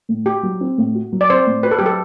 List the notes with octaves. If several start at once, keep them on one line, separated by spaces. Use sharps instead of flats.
A2
F#4 G4
F#3
C4
A2
F#4
F#3
D5
C4 C5
A2
F#4 B4
A4
F#3 G4
A4